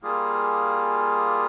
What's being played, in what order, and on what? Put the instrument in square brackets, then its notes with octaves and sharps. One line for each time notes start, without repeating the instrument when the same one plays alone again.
[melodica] G3 A#3 F4 G#4